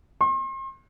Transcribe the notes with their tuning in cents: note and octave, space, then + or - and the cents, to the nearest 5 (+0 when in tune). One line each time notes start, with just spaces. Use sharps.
C6 +40